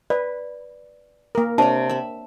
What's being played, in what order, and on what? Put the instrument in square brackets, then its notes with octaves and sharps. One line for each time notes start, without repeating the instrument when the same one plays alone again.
[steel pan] B4 [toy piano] D5
[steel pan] A#3 A#4
[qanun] C3 A#5 [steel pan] D4 C#5 [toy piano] A5
[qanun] E5 B5